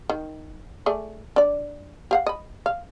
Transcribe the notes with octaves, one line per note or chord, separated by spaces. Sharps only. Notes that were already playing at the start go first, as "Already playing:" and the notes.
D#3
A3 G#4 D5
D4 D5
G4 F5 F#5
D#5 B5
F5